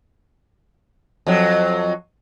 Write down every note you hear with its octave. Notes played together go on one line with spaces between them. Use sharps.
F2 F#3